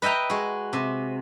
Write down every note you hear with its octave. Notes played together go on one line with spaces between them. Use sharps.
B4 D#5 E5 G5 A#5
G#3 F#4
C3